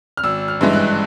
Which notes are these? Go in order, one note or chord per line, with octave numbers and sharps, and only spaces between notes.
F6
G#1 E6
F6
G2 E3 G#3
F#6